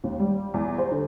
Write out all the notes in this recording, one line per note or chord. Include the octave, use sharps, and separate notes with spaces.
D#2
G3
E2
C5
D3